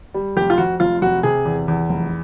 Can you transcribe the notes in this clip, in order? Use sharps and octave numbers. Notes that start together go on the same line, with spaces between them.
G3
F1 G4
F4
F2 F#4
F1 F4
F1 F#4
C3 G#4
E2
E2
F1